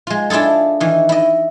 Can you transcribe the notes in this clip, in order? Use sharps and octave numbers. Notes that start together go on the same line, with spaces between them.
G#3 F4
D4 E4 F4 G#4 A4
D#3 E3
E4 D#5